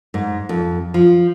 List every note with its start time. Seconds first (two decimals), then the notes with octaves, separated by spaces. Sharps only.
0.14 G#2
0.49 F2
0.94 F3